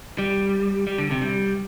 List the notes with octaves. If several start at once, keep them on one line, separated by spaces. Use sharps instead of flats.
G3
G3
D3
C3
G3